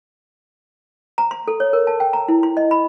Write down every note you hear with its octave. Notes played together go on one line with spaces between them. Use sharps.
A#5
C6
A4
C#5
A#4
A5
G5
A#5
E4
C6
D#5
B5